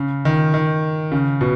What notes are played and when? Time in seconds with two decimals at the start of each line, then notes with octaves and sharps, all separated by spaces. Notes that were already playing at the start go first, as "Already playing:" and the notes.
Already playing: C#3
0.25 D#3
0.54 D#3
1.12 C#3
1.41 B2